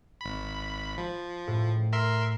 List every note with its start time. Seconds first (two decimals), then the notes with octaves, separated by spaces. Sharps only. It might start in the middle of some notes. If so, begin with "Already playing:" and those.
0.21 G#1 B5
0.98 F3
1.47 A2
1.93 A#4 E5 C6